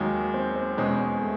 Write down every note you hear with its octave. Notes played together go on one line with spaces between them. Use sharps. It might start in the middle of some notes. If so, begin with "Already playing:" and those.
Already playing: D#2 D#3 F#3 G#3 F#4
C4 C5
C4 C5
E2 B2 G#3 C4 C#4 C5
A3 A4